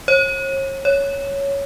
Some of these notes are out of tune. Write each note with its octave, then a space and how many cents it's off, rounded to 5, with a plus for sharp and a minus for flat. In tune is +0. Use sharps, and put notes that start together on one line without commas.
C#5 -40
C#5 +5